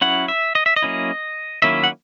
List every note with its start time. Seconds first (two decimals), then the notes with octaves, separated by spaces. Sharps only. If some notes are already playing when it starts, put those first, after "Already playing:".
0.01 F#3 C#4 E4 F#5
0.28 E5
0.55 D#5
0.66 E5
0.76 D#5
0.82 F#3 A#3 C#4 E4
1.62 D#3 F#3 A#3 C#4 E4 E5
1.84 F#5